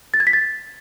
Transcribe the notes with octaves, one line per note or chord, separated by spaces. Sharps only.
A6
G#6
B6
A6